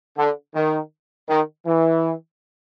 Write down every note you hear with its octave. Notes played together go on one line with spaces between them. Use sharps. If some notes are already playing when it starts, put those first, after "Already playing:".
D3
D#3
D#3
E3